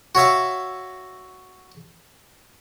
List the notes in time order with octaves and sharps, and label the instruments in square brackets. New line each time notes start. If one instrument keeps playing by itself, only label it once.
[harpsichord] F#4 C#5 E5 F5